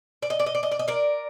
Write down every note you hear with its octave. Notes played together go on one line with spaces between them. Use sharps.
D5
D#5
D5
D#5
D5
D#5
D5
D#5
A#4 D5